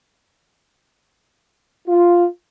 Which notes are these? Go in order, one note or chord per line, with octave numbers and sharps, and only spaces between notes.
F4